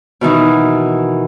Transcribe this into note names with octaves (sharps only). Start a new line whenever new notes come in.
B2 D#3 E3 D#4